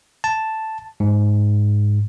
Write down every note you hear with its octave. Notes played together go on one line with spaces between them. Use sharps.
A5
G#2